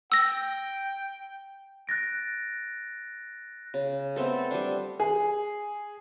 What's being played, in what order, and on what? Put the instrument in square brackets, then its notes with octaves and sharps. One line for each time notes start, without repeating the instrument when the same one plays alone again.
[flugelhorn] G5 [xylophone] E6 A#6
[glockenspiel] F#6 A6 A#6 D7
[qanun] C#3
A3 B3 C4 A4
G3 D4
[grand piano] G#4